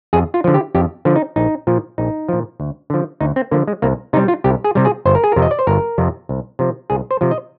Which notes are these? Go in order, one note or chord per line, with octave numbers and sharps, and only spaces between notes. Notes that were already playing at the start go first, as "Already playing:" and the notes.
F2 G#4
F4
D3 F3
G4
F2 G4
D3 F3
D#4
A#1 D#4
A#2 F3
A#1 D#4
A#2 F3
D2
D3 F3
D2 D#4
C4
D3 F3 A#3
G#3
C2 A#3
C3 G3 D#4
F4
C2 G4
G#4
C3 G3
G#4
G1 C5
A#4
G#4
F2 C3 A#4
D#5
D5
C5
G1 A#4
F2 C3
C2
C3 F3
C2 G#4
C5
C3 F3
D#5